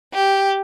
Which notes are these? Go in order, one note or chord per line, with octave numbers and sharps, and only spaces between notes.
G4